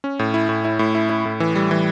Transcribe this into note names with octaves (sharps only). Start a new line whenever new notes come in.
C#4
A2
E4
A2
E4
A2
E4
E4
A2
E3
G3
E3